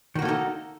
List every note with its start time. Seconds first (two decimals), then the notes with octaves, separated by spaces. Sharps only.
0.15 D#3
0.19 F#4
0.22 A#3
0.25 A4
0.28 D#4